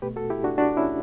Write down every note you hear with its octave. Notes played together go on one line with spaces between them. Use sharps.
B2 A3 G4 B4
F#4 A4
E4 G4
D4 F#4
D4 F#4
C#4 E4